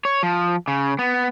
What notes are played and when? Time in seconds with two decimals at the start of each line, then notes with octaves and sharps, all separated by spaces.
0.05 C#5
0.23 F3
0.68 C#3
0.99 B3